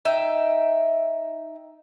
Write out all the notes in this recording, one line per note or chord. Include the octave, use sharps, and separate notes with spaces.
D#4 E5 G5